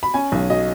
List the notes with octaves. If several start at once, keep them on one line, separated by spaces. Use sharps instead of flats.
B5
C#4 G#5
B1
F#3 D#5